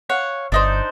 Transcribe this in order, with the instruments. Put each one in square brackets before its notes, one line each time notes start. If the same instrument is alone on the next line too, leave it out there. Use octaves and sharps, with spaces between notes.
[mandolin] C#5 F5 F#5
[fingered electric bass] G1 [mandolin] D4 D#4 C5